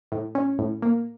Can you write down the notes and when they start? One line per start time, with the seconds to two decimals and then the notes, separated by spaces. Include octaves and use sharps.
0.12 A2
0.35 C#4
0.59 A2
0.82 A#3